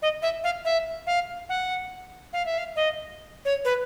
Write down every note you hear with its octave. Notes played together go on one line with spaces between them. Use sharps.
D#5
E5
F5
E5
F5
F#5
F5
E5
F5
D#5
C#5
B4